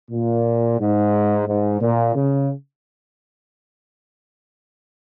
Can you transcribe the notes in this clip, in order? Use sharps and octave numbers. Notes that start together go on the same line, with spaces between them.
A#2
G#2
G#2
A#2
C#3